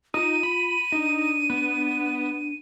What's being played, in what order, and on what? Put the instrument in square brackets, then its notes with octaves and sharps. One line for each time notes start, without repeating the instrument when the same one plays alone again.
[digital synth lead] D#4 [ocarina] F4 [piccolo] D#7
[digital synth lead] B5
[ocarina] D4 [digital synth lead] D#4
[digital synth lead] B3